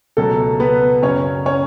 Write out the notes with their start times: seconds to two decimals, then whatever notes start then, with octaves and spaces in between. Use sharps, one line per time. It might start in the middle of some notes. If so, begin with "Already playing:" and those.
0.17 C#2 B2 F#3 A3 A4
0.60 B3 B4
1.02 F#2 C#3 F#3 C#4 C#5
1.46 C#4 C#5